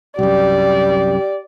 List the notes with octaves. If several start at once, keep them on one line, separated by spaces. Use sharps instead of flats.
C2 F#2 G4 D5